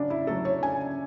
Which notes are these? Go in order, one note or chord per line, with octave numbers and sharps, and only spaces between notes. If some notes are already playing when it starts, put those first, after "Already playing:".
Already playing: C#3 F#3 D4
E4
F#3 A3 A4
C#5
C#3 G#5